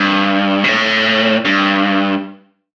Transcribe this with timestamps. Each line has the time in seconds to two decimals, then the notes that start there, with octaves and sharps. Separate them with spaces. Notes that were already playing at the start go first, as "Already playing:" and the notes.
Already playing: G2
0.64 B2
0.68 A2
1.45 G2